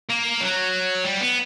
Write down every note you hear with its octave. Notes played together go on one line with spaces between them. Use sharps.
A#3
F#3
G3
B3